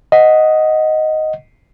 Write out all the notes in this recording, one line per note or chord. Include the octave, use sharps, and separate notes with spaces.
D#5 F#5